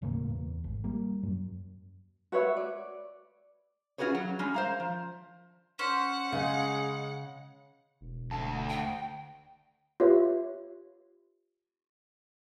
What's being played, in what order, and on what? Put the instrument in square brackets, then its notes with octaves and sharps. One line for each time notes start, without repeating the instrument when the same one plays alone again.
[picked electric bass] D#1 A2 C#3 A#3
E2
G#1
G3 A#3
F#2
[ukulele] F#4 B4 C#5 E5
D5
[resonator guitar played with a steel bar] C#4 F4 F#4 G#4 B4 C#5
F#3
G3 G#3 C#4
C5 F5 A#5
F3
[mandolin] C#4 C5 [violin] F#5
[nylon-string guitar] C#3 [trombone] G#3
[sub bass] E1
[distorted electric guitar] D2 A5
[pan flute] G5
[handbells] F4 G4 B4 C#5 E5